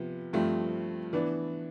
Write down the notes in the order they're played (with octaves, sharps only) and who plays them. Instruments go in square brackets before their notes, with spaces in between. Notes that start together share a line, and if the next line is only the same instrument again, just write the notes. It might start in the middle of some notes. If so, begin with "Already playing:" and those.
Already playing: [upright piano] C3 F3 B3
G2 F3 A3 C4
E3 B3 D4